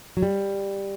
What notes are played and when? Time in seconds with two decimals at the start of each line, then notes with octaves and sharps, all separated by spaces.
0.17 F#3
0.22 G3